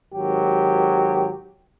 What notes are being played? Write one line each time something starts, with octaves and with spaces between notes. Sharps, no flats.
G#1 F#3 G4